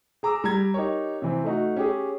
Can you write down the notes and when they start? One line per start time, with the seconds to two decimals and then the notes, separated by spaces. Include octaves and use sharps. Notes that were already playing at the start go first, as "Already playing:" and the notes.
0.23 G#4 A#5 D6 E6
0.44 G3 A#5 G#6
0.74 D#4 G4 A#4 C#5
1.22 C3 E3 C4
1.44 A3 D#4 F#4
1.76 C#4 G4 G#4